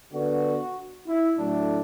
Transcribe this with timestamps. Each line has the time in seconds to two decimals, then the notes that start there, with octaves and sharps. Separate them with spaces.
0.13 D3 B3 F#4
1.07 E4
1.38 A2 F#3 A3 D4